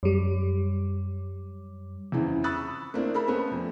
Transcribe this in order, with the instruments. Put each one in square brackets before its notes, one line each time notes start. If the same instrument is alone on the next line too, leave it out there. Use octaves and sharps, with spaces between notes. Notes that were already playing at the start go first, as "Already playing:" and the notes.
[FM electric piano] F#2 G3
[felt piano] E2 C#3 E3 C4
B5 C#6 D#6 E6 F#6 A6
A3 A#3 C4 D4 E4
A4 A#4 B5
A3 B3 C#4 C5
F2